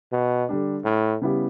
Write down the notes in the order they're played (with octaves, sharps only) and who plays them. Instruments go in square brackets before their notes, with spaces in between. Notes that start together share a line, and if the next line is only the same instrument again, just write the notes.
[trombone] B2
[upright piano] D3 G3 D4
[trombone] A2
[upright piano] C#3 G3 B3 E4 G4